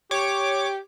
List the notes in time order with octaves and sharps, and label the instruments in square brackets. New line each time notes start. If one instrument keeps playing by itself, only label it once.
[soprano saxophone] G4 [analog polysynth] C#5 D6